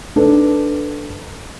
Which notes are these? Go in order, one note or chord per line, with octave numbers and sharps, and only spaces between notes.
D4 A4 B4